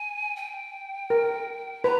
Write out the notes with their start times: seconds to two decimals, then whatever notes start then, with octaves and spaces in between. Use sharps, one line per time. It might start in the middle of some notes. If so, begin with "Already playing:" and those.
Already playing: G#5
0.36 G5
1.10 A#4
1.84 B4 A#5